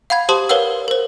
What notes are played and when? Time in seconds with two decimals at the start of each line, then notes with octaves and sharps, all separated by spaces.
0.10 F5 F#5 B5 G#6
0.29 G4 C5 A5 C6 D#6 F#7
0.49 A#4 B4 C#5 F5 F#5 E6
0.88 A#4 C5